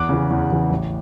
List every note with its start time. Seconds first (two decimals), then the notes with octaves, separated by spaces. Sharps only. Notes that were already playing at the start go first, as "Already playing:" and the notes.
Already playing: E2 D6 F#6
0.09 C#3 E3
0.30 E2
0.50 C#3 E3
0.71 A1